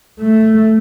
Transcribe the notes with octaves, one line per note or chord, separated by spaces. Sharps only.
A3